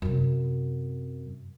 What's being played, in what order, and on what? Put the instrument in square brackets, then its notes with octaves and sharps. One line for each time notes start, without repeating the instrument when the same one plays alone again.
[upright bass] F#2 C3